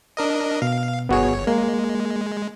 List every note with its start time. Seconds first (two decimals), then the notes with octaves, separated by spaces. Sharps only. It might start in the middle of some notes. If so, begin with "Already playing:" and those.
0.17 D4 A#4 D#5
0.62 B2 F5
1.09 G1 B3 F#4 G#4 C#5
1.47 G#3 A#3